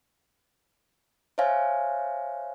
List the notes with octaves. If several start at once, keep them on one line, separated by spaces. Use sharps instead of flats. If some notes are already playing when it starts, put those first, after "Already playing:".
C5 C#5 E5 F5 G#5